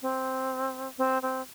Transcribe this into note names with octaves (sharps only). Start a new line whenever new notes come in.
C4
C4
C4